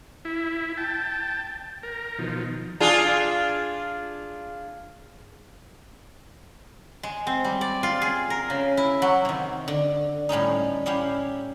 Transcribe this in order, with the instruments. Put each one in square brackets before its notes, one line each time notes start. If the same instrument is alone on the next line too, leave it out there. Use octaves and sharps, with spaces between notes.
[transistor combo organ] E4
G5 A5
A#4
B2 D#3 F3
[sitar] D4 F4 G#4
[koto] G#3
C4
G3
D5
F4
G#4
A#4
C#3
E4
F#3
[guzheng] C3 D#3
D3
A2 G3 C#4 D#4
C#4 E4 G4 F5